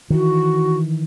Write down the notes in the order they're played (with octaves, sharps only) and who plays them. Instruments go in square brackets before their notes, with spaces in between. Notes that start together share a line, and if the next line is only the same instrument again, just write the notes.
[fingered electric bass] D#3 E3 [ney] F#4